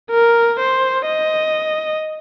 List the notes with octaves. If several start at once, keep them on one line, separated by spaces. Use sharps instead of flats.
A#4
C5
D#5